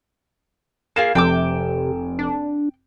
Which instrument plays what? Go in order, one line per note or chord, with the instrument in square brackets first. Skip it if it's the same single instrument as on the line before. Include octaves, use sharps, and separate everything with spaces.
[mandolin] A#3 F4 G#4 [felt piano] E7
[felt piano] F1 [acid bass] C3 [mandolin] G5 A5 D6
[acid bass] D4